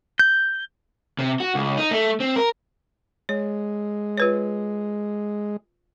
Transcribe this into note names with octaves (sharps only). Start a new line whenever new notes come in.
G6
C3
F#4
C#2
D#4
A3
C4
A#4
G#3 C#5
F4 B4 C#5